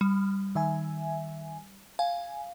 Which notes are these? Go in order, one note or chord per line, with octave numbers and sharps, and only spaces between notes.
G3
D#3 E5 G#5
F5 G#5